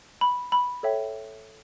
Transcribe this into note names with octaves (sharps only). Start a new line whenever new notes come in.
B5
B5
A4 C#5 E5 G5